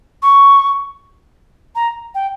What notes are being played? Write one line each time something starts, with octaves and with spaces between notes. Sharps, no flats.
C#6
A#5
G5